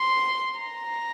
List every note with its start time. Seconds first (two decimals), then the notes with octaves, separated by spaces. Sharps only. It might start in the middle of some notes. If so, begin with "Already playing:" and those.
Already playing: C6
0.60 A#5